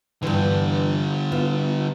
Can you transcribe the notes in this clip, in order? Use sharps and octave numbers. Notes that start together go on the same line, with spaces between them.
G2 D3 E3 G3
B3 E4 F4